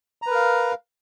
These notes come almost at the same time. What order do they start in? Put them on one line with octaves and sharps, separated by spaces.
A#5 B4 A#4 F5